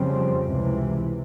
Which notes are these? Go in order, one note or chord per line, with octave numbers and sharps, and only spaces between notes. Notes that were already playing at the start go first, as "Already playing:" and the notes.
Already playing: F2 C#3 G3 C4
C#2 C3 E3